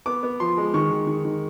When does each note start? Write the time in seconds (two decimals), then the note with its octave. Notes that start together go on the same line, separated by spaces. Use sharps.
0.06 B3 D6
0.23 B3
0.40 F3 C6
0.57 G#3
0.74 D#3 C#6
0.91 D#3
1.07 D#3
1.25 D#3